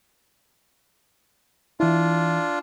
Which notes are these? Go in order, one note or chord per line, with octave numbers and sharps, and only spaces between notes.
E3 D4 E4 F4